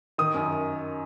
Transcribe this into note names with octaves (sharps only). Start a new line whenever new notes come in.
D#3 D#6
F#2